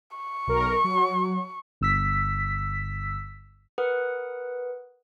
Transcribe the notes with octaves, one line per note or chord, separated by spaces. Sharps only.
C#6
B1 A#4
F#3
G1 E6 B6
A#4 B4 F#5 D#6